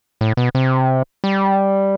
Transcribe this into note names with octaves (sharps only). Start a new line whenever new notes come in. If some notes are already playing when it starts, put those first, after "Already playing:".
A2
B2
C3
G3